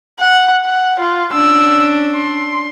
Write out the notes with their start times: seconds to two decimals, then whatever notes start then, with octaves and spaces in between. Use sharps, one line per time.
0.20 F#5
0.65 F#5
1.00 F4
1.33 C#4 D4 E6
2.15 C6